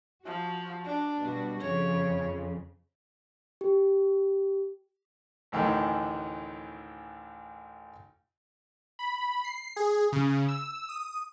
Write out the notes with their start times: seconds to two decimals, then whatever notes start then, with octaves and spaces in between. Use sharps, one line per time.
0.26 F3 F#4
0.85 D4
1.18 B2 G3 F#4
1.61 F2 C#3 C#5
3.61 G4
5.52 A1 D2 D#3 E3
8.99 B5
9.44 C7
9.76 G#4
10.12 C#3
10.48 E6
10.89 D#6